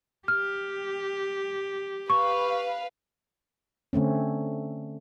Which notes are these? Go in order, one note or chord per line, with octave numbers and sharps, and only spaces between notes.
G4 F6
B4 F5 C#6
D3 A3 C4 C#4